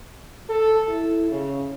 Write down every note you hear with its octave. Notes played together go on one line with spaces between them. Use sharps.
A4
E4
C#3